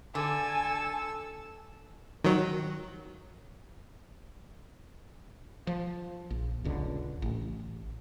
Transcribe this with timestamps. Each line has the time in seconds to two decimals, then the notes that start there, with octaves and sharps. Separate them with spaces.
0.15 D3 A4 G#5 E6
2.24 D#3 F#3
5.67 F3
6.31 A#1
6.64 D#1 C#2 D3
7.22 A1